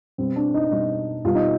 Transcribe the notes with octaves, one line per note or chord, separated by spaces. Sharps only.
B2 G3 C4
D4
D#4
B2 G3 D#4
B2 G3 F4
D#4